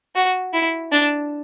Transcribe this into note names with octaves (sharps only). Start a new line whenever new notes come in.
F#4
E4
D4